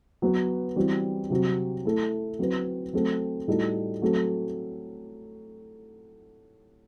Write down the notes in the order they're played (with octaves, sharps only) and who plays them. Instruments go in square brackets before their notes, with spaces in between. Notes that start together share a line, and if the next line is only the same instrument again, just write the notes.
[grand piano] F#3 B3 F#4 B4
E3 G3 C4 F#4
C3 F#3 C4 F#4
A3 E4 A4
F#3 C4 F#4 B4
F#3 A3 C4 F#4 A4
A2 G3 D#4 F#4 A4
F#3 A3 C4 F#4 A4